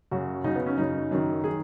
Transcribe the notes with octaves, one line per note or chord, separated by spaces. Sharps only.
F#2 C#3 F#4
F#2 C#3 D#4
B3
C#4
F#2 C#3 D#4
F#2 D#3
D#3 G#4